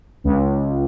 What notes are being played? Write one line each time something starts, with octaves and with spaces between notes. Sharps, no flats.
C#2